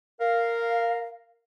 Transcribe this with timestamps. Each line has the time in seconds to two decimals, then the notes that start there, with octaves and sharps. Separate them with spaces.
0.21 A#4 F5